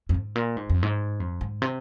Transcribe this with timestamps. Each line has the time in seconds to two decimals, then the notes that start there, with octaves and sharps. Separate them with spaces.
0.09 F2
0.14 G#2
0.35 A#2
0.57 G#2
0.70 F2
0.83 G#2
1.20 F2
1.41 G#2
1.62 C3